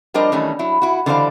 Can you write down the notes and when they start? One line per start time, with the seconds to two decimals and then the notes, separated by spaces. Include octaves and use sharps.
0.14 F3 G3 D4 A#4 C5 D#5
0.32 D#3 E3 G3 A3 C#4
0.59 F#3 E4
0.82 E4 F#4
1.06 D3 E3 G3 C5 D5 F5